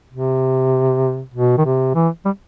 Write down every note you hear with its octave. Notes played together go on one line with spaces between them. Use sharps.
C3
B2
D#3
C3
E3
G3